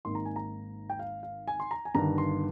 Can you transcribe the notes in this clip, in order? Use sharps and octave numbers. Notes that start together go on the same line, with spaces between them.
G#1 G#2 D#3 A#3 C6
A#5
G#5
A#5
G5
F5
F5
G#5
C6
A#5
G#5
G1 G2 D#3 A#5
C6